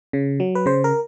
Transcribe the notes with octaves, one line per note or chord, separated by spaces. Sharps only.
C#3
F#3
B4
C#3 C5
A#4